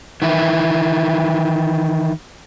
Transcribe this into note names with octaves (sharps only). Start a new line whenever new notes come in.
D#3 E3 E4